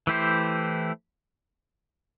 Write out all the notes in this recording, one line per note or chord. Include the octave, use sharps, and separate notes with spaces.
E3 A3 E4 G4 C5